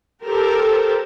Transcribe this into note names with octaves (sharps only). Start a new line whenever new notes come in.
G4 A4 A#4 C5